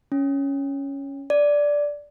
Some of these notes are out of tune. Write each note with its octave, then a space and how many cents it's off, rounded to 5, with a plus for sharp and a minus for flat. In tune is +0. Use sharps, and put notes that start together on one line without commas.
C#4 +0
D5 -5